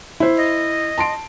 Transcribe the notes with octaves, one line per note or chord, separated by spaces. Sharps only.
E4 C5
D#5
A5 C6 D7